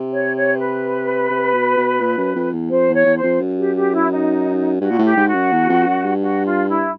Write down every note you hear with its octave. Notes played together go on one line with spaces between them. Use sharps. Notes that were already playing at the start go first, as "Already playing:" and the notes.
Already playing: C3
C#5
C#5
C5
B4
C3
B2
B2
A#2
F#2
F2
E2
F2 C5
E2
C#5
E2
C5
F2
F#2
G4
G4
E4
D#4
G2 F#4
A#2
A2
G4
G#2
F#4
F#2
E2
F2
F#2
G2
F#4
F4
E4